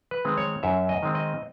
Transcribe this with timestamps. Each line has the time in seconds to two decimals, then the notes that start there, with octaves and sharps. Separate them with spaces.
0.11 B4
0.25 D#3 G#3 C4
0.38 C#5
0.63 F#2 E5
0.89 D#5
1.03 D#3 G#3 C4
1.15 D#5